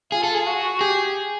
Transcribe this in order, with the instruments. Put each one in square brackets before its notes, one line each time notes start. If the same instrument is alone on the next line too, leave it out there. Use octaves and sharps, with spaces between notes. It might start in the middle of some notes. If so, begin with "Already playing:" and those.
[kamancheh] F4 [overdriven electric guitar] G#4
[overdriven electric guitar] A4
G#4
[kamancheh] F#4
[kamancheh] G4 [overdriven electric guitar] G#4